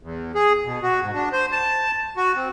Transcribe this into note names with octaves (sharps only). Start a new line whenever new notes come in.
E2
G#4
B2
F#4
G#2
D4
C5
A5
F#4
C4